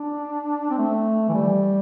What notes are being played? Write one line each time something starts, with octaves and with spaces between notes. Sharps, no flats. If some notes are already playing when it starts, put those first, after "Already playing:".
Already playing: D4
C4
A3
E3
G3